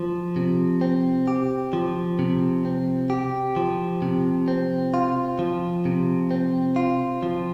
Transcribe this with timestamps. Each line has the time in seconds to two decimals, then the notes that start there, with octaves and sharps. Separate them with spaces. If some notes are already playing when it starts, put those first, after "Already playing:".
Already playing: F3
0.36 C3
0.81 C4
1.28 G4
1.73 F3
2.19 C3
2.65 C4
3.10 G4
3.56 F3
4.02 C3
4.48 C4
4.94 F4
5.39 F3
5.85 C3
6.31 C4
6.76 F4
7.23 F3